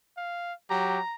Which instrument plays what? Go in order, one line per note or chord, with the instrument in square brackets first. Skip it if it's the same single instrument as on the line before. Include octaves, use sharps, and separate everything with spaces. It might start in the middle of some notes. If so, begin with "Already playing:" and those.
[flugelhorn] F5
[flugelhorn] F#3 [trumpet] G4 [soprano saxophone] A#5